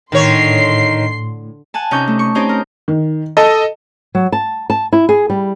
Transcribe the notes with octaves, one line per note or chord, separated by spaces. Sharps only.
A2 D3 D#3 C#5 C6 C7
F#5 G#5 A5
C3 C#4 D#4 C#6 D6 G6
A3
C#6
C4 C#4 D#4 G4 C5 C#5
A#4
D#3
A4 D#5 A5
F#3
A5
A5
E4
G#4
G3